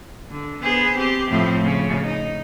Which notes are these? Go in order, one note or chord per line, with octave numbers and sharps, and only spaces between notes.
D3
B3 G#4 C5
C4 G4
A2 F3 C4
C#3
D#4